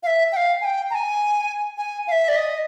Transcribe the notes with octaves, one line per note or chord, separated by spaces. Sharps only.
F5
E5
G5
F5
G#5
G5
A#5
G#5
G#5
F5
E5
D5
D#5